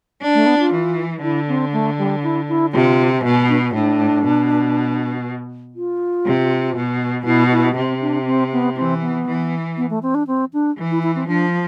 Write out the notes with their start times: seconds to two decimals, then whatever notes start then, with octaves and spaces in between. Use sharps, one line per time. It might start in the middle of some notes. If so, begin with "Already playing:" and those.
0.22 D4
0.34 A3
0.46 B3
0.59 F4
0.72 E3
1.22 D3 E4
1.48 C4
1.72 A3
1.98 G3
2.23 E4
2.48 E4
2.73 C3 F4
3.24 B2
3.49 D4
3.74 A2 D4
4.24 B2
5.75 F4
6.26 C3
6.76 B2
7.25 B2 E4
7.51 E4
7.76 C3 C4
8.01 D4
8.26 C4
8.52 B3
8.76 E3 C4
9.02 B3
9.27 E3
9.77 B3
9.90 A3
10.02 C4
10.15 D4
10.27 C4
10.53 D4
10.78 E3
10.91 E4
11.03 E4
11.15 C4
11.28 F3 D4